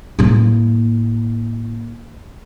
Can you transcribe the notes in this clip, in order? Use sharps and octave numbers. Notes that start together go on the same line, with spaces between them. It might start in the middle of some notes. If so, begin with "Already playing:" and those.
A2 A#3